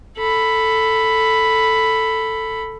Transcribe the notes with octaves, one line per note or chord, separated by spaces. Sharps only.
A4 B5